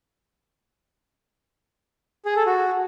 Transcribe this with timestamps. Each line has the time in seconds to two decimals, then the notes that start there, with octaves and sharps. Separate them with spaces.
2.26 G#4
2.36 A4
2.46 F#4